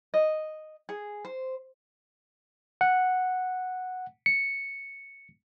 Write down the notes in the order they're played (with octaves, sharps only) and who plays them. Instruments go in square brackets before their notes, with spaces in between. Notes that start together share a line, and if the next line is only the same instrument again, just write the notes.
[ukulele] D#5
G#4
C5
[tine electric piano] F#5
C#7